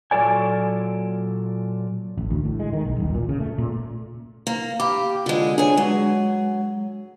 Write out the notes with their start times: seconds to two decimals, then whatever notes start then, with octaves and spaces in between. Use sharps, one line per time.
0.11 A#2 F#3 F4 A4 D5 G#5
2.17 A1
2.30 D2
2.45 A2
2.60 G#3
2.73 D#3
2.85 B1
3.00 D#1
3.14 A#2
3.29 C#3
3.40 A3
3.58 A#2
4.47 A#3
4.80 G4 F5 B5 D6
5.26 D3 G#3 F4
5.58 D4 G#4 B4 C#5 G#5
5.77 F#3 G#3